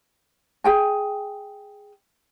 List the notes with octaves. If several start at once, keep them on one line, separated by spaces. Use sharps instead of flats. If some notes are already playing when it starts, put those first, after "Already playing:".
G#4 G5 G#5